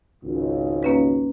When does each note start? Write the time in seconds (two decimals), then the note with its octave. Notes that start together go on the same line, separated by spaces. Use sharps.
0.24 G#1 C#2
0.83 A#3 C#4 B4